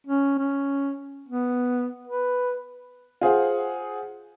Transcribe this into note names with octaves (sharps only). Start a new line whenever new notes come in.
C#4
C#4
B3
B4
F4 G#4 C5 F#5